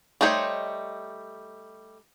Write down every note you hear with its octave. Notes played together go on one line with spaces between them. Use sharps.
G3 A3 D#4 C5 C#5